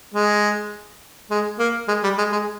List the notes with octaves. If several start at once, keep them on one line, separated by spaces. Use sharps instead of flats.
G#3
G#3
A#3
G#3
G3
G#3
G#3